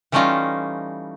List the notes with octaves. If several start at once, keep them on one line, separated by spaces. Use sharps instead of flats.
E3 G3 A3 C#4 D#4 F4